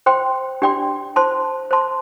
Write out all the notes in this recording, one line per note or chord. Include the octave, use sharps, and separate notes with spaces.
C5 G5 C6
D4 G4 D5 G5 C6
C5 A5 C6
C5 A5 C6